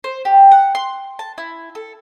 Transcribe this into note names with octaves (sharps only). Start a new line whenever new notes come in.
C5
G4
F#5
C6
A5
E4
A4